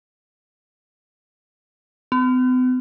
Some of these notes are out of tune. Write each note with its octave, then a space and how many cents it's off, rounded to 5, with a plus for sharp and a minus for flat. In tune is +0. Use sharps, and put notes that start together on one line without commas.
B3 +45